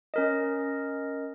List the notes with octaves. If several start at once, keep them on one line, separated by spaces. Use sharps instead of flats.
C#4 A#4 D#5